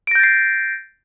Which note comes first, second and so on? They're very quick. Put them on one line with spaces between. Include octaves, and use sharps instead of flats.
D7 A#6 G6 A6 C7